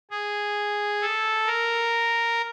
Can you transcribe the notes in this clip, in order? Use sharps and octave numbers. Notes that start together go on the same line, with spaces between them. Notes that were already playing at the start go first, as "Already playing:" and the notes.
G#4
A4
A#4